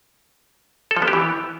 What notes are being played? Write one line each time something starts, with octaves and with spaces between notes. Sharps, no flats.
A4
F3
B3
G4
E3